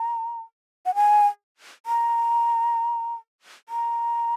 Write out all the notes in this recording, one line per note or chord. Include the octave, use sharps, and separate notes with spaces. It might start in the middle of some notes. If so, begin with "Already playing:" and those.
Already playing: A#5
F#5
G#5
A#5
A#5